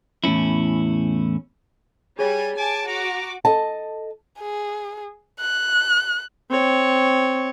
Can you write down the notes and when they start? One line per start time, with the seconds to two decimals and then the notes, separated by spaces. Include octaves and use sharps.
0.24 E2 A2 C3 C#4 E4
2.19 G3 G#4 C#5 G#5
2.57 G#5 A5 D6
2.87 F#4 A#5 D6
3.45 A4 D#5 A5
4.39 G#4
5.40 F#6
6.50 C4 C#5